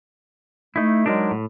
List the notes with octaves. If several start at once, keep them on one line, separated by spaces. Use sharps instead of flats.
A3 D#4 E4
F#3 G#3 D4 D#4 A#4
A2